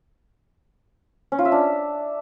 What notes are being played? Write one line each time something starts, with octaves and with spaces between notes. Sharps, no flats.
C#4
F4
E5
D4